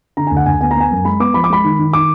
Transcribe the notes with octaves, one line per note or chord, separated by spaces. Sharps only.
D3 A#5
D2 G#5
F#5
D2 G#5
B3 G#5
A#5
B3 G#5
F#2
G#3 B5
B3 D6
F3 B5
D6
G#3 B5
D#3
D#3
D#3 D6